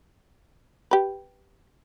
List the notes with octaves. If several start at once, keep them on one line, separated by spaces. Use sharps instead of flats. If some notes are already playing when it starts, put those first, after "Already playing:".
G4 B4